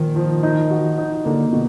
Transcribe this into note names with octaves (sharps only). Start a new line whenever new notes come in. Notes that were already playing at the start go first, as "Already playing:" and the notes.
Already playing: A#2 D#3 F3 F4
F3
D#4
F#4
D#4
D3 A#3
B2